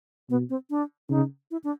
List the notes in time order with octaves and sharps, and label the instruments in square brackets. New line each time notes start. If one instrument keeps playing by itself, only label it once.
[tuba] B2 [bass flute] B3
[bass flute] C4
D4
[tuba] C#3 [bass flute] D#4
[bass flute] E4
D4